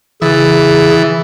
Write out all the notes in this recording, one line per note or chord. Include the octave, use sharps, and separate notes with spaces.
C#3 E3 G#4 A6